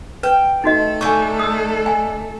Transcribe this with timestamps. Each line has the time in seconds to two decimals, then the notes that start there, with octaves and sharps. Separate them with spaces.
0.23 B4 G5
0.64 A3 D#4 F#4 A4 D#5
1.01 D3 D#4 G#5 C#6
1.39 D#6 E6
1.86 G#5